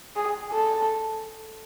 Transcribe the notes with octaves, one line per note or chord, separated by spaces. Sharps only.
G#4
A4